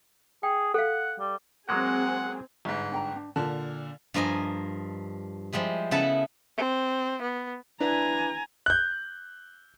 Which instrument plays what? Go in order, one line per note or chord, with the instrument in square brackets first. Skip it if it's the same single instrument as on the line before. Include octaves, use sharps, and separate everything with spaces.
[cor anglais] G#4 [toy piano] G5
[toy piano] A4 F5 [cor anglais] F#5
[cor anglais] G3
[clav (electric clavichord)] F#3 G#3 A#3 [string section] C4 G#4 [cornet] F#5
[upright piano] G1 G#2 [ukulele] E5
[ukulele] D4 G5 A#5
D4
[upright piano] A#2 D3 [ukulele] A5
[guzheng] G2 F3 A#4 D#5 G#5
F3 G3 G#3 E4
C#3 B3 E4 A4 B4 A5
[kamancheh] C4
B3
[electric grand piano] D4 E4 B4 [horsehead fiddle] G#5 A#5
[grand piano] F#6 G6